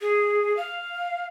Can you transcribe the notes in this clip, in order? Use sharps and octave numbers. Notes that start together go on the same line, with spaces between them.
G#4
F5